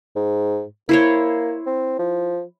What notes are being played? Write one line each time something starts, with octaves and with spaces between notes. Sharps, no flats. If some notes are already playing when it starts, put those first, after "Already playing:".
G#2
A#3 E4 C5 C#5
C4
F3